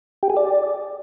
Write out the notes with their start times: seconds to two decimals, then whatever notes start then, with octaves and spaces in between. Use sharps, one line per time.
0.23 G4
0.30 G#4
0.37 D5